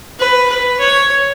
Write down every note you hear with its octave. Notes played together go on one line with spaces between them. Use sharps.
B4
B4
C#5